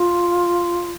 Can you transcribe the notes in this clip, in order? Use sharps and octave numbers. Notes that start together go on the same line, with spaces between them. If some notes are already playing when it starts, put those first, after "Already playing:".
Already playing: F4